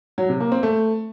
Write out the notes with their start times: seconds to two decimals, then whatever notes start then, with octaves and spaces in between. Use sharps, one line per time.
0.18 F#3
0.29 C3
0.40 A#3
0.52 C4
0.63 A3